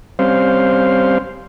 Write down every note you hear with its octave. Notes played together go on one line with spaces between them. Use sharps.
G3 C4 C#4 C5 F5